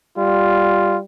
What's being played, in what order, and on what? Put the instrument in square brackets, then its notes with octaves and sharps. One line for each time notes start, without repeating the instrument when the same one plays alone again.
[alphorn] G3 [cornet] F4